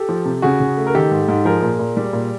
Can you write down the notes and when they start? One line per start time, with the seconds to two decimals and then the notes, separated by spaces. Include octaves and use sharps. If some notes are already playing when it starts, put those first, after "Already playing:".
Already playing: G4 A4
0.09 F3
0.25 C3
0.42 C#3 F#4 G#4
0.60 C#3
0.77 A3
0.87 A#4
0.95 D#3 G4 A4
1.11 G#2
1.28 G#2
1.45 F3 G#4 A#4
1.62 A#2
1.79 A#2
1.97 G3
2.13 A#2